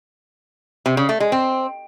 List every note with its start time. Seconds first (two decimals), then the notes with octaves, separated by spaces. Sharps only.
0.86 C3
0.97 C#3
1.09 A3
1.20 G#3
1.32 C4